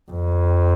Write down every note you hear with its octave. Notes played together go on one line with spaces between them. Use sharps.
F2